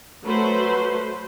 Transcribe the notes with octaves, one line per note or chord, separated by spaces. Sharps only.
F#3 A3 B4 C5